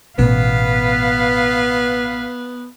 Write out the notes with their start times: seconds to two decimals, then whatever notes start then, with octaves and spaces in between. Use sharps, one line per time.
0.19 A1 B2 B3 B4 F5